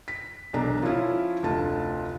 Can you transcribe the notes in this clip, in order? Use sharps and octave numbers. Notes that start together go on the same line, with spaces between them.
B6
E1 B1 D4 A#5
F3 C#4 E4 F4
F1 D2 F4 A5